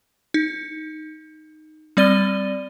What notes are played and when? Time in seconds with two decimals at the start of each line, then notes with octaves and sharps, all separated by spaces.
0.34 D#4
1.97 G3 C4 D5 A6 D#7 G7